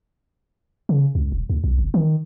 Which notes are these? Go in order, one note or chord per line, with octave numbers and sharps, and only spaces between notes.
C#3
C#2
D#1
D2
B1
F#1
D#3